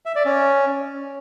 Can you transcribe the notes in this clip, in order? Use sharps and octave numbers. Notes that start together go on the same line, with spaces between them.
E5
D5
C#4